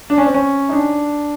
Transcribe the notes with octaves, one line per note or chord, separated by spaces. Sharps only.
D4
C#4
C4
C#4
D#4
D4